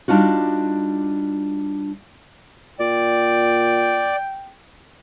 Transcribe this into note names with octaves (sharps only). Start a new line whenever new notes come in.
G3 D4 D#4 F4 F#4
A#2 D5 G5